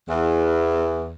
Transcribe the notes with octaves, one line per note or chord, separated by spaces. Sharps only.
E2